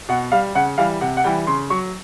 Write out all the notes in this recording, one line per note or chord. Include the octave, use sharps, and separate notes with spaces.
B2 F#5
G3 F5
C#3 F#5
E3 G3 F5
C3 F#5
F#5
E3 G3 G5
C#3 C6
F#3 C#6